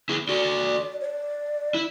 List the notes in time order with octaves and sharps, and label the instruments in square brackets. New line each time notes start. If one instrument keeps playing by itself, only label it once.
[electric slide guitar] E4 G#4
[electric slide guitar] F#4 A4 [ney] D5
[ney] C#5
D5
[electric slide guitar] E4